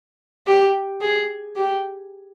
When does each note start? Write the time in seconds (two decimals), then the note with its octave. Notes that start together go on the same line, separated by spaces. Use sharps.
0.47 G4
1.01 G#4
1.56 G4